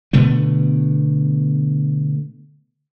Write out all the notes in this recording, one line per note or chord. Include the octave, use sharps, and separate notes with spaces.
B2 D3 A3 B3